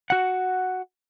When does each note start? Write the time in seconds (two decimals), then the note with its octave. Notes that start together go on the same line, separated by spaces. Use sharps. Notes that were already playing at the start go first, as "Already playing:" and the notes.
0.10 F#4 F#5